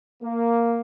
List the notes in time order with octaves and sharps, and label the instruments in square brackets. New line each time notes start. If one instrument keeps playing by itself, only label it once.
[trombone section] A#3